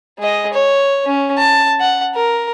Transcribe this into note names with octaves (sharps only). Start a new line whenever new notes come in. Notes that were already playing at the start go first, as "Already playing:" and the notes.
G#3 D#5
C#5
C#4
A5
F#5
A#4